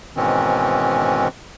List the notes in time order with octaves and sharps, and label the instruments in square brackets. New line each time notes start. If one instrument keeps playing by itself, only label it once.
[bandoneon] G#2 B2 D#3 E3 C4 C#4